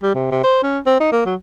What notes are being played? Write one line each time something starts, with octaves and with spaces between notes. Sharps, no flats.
G3
C3
C3
C5
C#4
C4
D#4
A#3
F#3